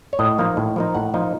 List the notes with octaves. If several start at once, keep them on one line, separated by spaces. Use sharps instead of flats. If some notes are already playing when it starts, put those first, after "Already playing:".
C#5
A2 D#5
F3 A#3 D#4
A2
F3 A#3 D#4
A2 F#5
F3 A#3 D#4